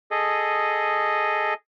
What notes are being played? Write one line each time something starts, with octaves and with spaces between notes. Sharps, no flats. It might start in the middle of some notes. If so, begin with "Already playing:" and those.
G#4 A4 D#5